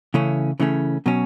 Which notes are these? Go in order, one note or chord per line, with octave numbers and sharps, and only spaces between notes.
C#3 E3 A3 C#4
C#3 E3 A3 C#4
B2 F#3 C#4